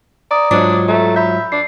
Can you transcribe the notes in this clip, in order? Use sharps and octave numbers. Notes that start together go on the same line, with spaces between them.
D5 A#5 D6 D#6
G#2 F#3 D4 F4
A3 A#5
E5 B5 G6
D4 C7